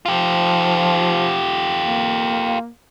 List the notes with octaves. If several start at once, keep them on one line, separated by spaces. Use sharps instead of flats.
F3 F4 G4
A#3